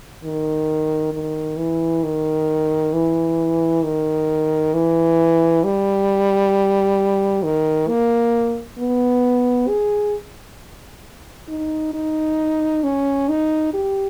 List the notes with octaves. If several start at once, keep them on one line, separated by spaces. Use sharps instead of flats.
D#3
D#3
E3
D#3
E3
D#3
E3
G3
D#3
A#3
B3
G#4
D#4
D#4
C#4
D#4
G4